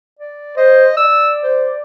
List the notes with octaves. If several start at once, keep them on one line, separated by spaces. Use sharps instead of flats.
D5
C5 D#5
D5 E6
C5